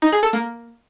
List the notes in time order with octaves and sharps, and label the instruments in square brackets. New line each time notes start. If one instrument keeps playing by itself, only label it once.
[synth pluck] D#4
G#4
A4
A#3